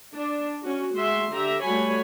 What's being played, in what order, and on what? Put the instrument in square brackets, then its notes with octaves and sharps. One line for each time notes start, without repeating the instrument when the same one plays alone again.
[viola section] D4
C#4 F#4
G#3 F#4 E5 C6
D3 G4 E5 A#5
G3 A3 F#4 C#5 G#5 B5